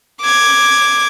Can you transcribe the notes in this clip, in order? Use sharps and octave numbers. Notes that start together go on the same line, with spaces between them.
D6 G#6